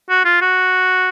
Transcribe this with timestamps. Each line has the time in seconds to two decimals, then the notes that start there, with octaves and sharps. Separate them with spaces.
0.10 F#4
0.25 F4
0.41 F#4